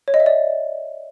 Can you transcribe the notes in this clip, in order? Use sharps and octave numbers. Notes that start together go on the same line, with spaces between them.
C#5
D#5
E5
D5